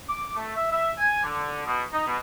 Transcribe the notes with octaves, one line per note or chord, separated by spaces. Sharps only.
D6
A3
E5
E5
G#5
D3
B2
D#4
B2